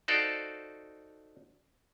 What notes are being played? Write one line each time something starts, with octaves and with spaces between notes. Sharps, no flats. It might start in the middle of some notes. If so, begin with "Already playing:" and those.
D#4 F#4 A4 C5 D5 F5